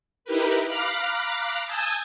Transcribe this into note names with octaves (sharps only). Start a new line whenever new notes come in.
D#4 E4 G4 A#4 B4
F5 A#5 B5 D6 F6 F#6
G#5 A5 D#6 E6 G6 G#6